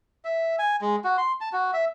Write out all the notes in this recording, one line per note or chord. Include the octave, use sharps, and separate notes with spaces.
E5
G#5
G#3
F#4
C6
A5
F#4
E5